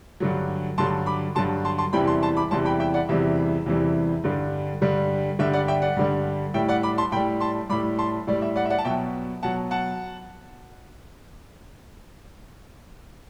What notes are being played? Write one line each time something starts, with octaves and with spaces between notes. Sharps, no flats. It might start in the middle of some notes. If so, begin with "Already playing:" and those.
G2 D3 F#3
G2 D3 F#3 A5 C6
B5 D6
G2 D3 F#3 A5 C6
A5 C6
A5 C6
E2 C3 E3 G3 G5 B5
A5 C6
A5 C6
B5 D6
E2 C3 E3 G3 A5 C6
G5 B5
E5 G5
D5 F#5
E2 C3 E3 G3 E5
E2 C3 E3 G3
G2 D3 G3
G2 D3 G3
G2 D3 G3 E5
D5 F#5
E5 G5
D5 F#5
G2 D3 G3
A2 G3 E5 G5
D5 F#5
B5 D6
A5 C6
A2 G3 G5 B5
A5 C6
A2 G3 B5 D6
A5 C6
A2 G3 D5
E5
D5 F#5
E5
D5 F#5
A5
B2 F#3 E5 G5
B2 F#3 F#5 A5
F#5 A5